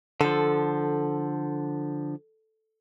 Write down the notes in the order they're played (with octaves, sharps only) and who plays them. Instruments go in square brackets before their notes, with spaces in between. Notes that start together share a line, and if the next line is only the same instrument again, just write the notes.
[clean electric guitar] D3 F3 [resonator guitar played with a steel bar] A4